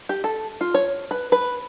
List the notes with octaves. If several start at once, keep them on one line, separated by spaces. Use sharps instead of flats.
G4
A4
F4
C#5
B4
B4